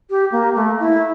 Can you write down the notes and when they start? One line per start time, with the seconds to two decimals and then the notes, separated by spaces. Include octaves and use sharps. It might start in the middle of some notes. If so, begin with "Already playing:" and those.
0.10 G4
0.32 A#3
0.55 A3
0.80 E4